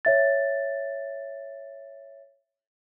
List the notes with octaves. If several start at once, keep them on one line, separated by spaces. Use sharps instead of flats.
C#5 E5 A6